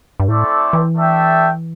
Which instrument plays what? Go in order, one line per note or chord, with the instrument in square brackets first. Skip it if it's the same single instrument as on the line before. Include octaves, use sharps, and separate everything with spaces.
[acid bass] G2
[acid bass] A2 [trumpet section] A3 C4 E4 A4 D5
[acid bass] E3
[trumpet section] A3 D4 A4 E5 G5